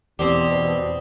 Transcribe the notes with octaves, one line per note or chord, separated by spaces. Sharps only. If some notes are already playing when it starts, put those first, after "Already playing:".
E2 B2 C4 G4 D5 A5 D#6